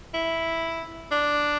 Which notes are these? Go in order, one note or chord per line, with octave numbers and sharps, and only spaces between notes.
E4
D4